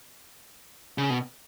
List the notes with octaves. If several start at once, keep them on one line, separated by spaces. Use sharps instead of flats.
C#3
B2